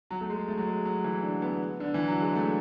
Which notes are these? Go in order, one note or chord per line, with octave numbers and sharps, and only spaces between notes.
F#3
A3
G#3
A3
F#3
G#3
F#3
E3
D3
B3
D3
E3
F#3
G#3
A3